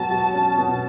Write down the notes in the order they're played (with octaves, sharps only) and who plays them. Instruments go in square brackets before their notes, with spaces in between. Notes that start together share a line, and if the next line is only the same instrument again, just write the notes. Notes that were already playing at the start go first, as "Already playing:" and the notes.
Already playing: [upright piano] B2 F#3 [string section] A5
[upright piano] F#4
C#4
B2